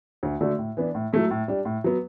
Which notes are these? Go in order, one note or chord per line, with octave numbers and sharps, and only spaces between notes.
D2
D3 A3 D4 F#4
A2
E3 B3 D4
A2
F#3 A3 E4
A2
G3 D4
A2
F#3 B3